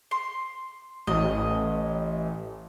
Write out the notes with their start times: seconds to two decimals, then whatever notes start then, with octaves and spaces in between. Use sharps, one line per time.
0.11 C6
1.07 A1 D#5